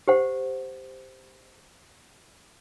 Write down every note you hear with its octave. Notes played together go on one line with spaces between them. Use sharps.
G4 C5 F#5